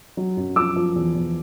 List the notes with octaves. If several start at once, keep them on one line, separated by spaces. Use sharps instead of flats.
F#3
F#2
F3 D6 E6
F3
E2
E2